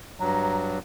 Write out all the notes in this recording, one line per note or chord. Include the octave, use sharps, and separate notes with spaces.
G2 F#3 A#5